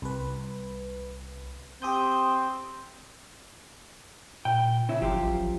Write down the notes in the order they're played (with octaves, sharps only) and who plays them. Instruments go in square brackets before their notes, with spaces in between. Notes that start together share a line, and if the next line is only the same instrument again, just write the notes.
[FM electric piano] C2 B4
[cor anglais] C4 [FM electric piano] G4 D#6 G6
[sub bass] A#2 [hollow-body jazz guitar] G5
[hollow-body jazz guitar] C#3 E4
[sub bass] G1 [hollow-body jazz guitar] F#2 F3 G4
[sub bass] A1
A1